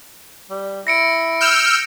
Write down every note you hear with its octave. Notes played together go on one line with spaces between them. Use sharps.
G3
E4 A#6 C#7 D7
E6 F6 G6